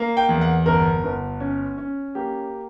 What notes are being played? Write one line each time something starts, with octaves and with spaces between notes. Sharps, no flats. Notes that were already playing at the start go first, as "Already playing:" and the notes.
Already playing: A#3
G5
E2
F#5
G1 A#4
G1
C#4
C#4
A#3 G4